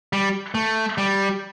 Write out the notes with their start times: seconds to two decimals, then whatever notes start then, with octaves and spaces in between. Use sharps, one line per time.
0.13 G3
0.55 A3
0.98 G3